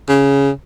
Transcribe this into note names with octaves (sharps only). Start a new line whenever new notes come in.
C#3